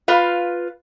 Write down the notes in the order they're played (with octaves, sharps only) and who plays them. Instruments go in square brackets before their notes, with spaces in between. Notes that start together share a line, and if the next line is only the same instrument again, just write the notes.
[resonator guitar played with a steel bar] F4 B4 F5